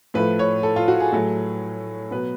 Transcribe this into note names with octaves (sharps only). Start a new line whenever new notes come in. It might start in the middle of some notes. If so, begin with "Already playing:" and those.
A2 F3 A3 B4
C#5
A4
F4
F#4
G#4
A2 F#3 A3
B2 F#3 B3 B4